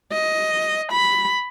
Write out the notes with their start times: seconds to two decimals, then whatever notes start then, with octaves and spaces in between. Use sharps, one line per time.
0.13 D#5
0.92 B5